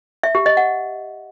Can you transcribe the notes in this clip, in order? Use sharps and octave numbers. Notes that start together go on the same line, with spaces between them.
E5
G4
D#5
F#5